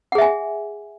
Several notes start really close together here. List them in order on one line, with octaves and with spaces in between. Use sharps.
F#5 G#4 E5 G#5